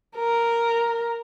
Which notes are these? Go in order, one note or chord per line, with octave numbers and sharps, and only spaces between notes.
A#4